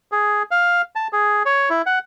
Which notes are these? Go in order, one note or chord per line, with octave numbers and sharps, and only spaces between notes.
G#4
F5
A5
G#4
C#5
E4
F#5